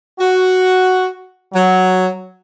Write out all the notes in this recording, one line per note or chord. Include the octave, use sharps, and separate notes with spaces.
F#4
F#3